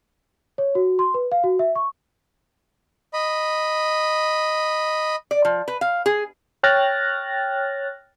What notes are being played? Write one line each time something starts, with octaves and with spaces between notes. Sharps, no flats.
C#5
F#4
C6
B4
F5
F#4
E5
C#6
D#5 B5
D5
F3
B4
F5
G#4
C#5 G5 F6 F#6 A6 A#6